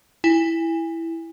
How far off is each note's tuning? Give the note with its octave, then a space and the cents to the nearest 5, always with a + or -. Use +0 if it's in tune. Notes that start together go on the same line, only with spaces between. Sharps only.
E4 +0 G#5 -30